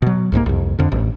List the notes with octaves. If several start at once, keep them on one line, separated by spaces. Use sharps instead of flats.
B2 F#3
C2 G#2 E3 A#3
C2 F2
F2 D3
A1